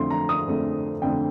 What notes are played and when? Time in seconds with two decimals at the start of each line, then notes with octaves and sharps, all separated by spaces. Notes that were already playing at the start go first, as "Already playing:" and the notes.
Already playing: F2 D3 A3 C6
0.11 A#5
0.29 D#6
0.47 F2 D3 A3
1.02 F2 D3 A3 G5